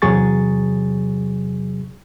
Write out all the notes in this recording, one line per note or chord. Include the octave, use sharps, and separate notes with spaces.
E2 C3 F#3 G#4 C#6 A6